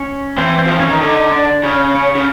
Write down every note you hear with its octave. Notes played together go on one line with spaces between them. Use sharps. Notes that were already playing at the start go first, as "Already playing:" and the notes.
Already playing: C#4 C#5
E3 C4 C5
C4 C5
F3
E3 C#4 C#5
D#3
D3 D#4 D#5
D4 D5
C#3 C#4 C#5
C#4 C#5
C#3